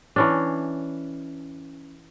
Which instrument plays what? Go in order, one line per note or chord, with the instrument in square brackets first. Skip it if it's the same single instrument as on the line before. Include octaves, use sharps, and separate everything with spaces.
[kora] E3 C#4 D4